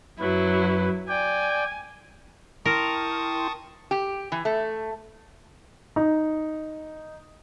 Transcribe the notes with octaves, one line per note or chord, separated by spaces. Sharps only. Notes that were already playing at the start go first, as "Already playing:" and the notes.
F#2 F#3 E4 B4
D5 G5 G#5
E4 A#4 G5 A5 C6 C#6 D#6
G4
E3
A3
D#4